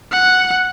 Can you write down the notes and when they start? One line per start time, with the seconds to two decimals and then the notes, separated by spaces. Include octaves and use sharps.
0.11 F#5